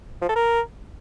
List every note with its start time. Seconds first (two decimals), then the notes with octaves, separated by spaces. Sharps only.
0.22 F3
0.29 A4
0.36 A#4